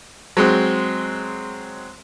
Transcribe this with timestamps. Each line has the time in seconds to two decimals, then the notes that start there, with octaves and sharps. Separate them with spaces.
0.37 F#3 G#3 C4